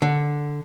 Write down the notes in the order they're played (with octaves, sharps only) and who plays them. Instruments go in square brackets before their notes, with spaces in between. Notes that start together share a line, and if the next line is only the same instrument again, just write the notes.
[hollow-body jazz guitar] D3